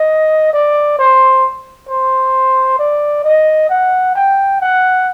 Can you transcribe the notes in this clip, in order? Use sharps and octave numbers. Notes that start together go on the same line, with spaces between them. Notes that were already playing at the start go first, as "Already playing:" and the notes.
Already playing: D#5
D5
C5
C5
D5
D#5
F#5
G5
F#5